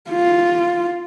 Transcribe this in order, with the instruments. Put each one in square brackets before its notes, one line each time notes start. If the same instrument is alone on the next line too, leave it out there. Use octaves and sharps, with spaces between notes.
[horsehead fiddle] F4